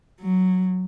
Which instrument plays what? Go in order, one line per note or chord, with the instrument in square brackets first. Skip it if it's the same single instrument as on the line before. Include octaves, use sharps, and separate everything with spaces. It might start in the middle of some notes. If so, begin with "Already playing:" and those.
[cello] F#3